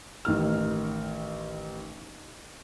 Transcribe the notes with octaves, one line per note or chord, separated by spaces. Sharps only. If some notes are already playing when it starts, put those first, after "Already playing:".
A1 D#3 F6